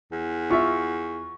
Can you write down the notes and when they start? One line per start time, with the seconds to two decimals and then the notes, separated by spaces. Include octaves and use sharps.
0.12 E2
0.50 F4 E5 C#6